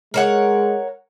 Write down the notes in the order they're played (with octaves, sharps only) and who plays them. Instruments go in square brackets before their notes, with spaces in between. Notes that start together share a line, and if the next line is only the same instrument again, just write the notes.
[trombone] G#3 [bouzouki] A#4 C#5 F#5